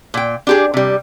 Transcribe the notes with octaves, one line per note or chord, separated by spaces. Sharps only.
A#2 G5
D4 G4 G#4
C3 G3